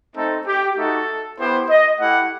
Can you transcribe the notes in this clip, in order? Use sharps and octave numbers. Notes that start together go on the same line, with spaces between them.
A3 C4 D#4 A4
G4
A3 D#4 F#4 A4
B3 E4 G4 C5
D#5
A3 E4 G4 F#5